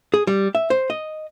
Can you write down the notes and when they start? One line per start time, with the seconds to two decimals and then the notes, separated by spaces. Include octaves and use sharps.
0.14 G#4
0.27 G3
0.55 E5
0.70 C5
0.90 D#5